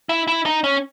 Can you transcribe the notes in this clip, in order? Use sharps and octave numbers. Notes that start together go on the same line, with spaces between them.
E4
E4
D#4
C#4